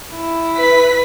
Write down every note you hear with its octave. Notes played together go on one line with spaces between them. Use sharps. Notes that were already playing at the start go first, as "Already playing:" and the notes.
E4
B4 B6